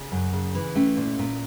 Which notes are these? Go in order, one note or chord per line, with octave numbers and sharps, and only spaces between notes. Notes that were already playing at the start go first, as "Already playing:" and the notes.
Already playing: C#3
F#2
C#3
E3
A3 C#4
A#2
A#2